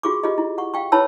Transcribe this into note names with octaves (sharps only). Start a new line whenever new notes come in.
F4 F#4 G#4 C#6 D6
F4 G4 G#4 D#5
E4
F#5 C#6
F5 G5 C#6
E4 B4 C#5 A5 B5 E6